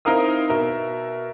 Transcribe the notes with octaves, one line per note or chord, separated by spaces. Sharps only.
C4 D#4 E4 A#4 F5 D#6
B2 A#4 E5